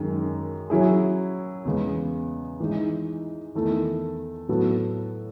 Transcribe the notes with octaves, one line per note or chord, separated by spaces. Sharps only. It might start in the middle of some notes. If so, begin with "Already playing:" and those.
Already playing: F#2 D#3 G#3
F#3 C#4 E4 G#4
E2 C#3 G#3 B3
E3 G#3 D#4
E2 D#3 A3 E4 A4
A2 F#3 B3 F#4 A4